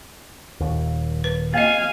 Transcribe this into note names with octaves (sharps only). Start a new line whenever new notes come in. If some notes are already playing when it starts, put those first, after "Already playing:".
D#1 D#2
B4
A#3 D#5 F5 G#5